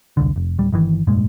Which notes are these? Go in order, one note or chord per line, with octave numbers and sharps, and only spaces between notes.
E1 C2 D3
F1
D1 G3
G1 D#3 E3
F1 G2 A#2 G#3